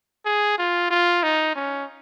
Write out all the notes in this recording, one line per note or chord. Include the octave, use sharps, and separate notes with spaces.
G#4
F4
F4
D#4
C#4